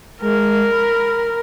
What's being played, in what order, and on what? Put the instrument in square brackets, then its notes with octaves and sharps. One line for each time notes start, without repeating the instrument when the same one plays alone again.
[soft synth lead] G#3 [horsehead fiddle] A#4
[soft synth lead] B5